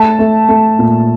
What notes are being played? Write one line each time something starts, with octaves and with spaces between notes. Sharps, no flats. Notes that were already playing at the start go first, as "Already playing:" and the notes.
Already playing: A3 A5
A3
A3
A#2